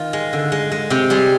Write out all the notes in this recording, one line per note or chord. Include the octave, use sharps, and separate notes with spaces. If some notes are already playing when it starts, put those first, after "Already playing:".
Already playing: D#3 F4
G#3
D3
G#3
G#3
C3 G4
G3 G#4